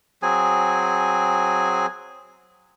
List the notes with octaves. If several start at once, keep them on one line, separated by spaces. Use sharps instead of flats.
F#3 C4 G#4 G#5